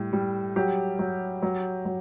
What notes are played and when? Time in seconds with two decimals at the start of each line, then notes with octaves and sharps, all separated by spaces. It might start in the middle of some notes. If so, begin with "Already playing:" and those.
Already playing: A2 G3
0.13 G3
0.56 F#3 G4
0.99 F#3
1.42 F#3
1.85 F#3